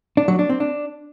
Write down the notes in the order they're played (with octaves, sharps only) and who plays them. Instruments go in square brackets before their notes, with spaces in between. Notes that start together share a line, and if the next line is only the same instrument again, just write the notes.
[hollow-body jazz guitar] D4
F#3
D4
C4
D4